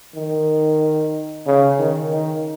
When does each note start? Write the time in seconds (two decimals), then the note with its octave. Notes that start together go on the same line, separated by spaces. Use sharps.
0.16 D#3
1.46 C#3
1.79 D#3
2.12 D#3